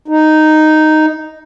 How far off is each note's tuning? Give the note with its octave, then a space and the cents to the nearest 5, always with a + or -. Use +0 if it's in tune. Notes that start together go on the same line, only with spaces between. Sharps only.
D#4 -5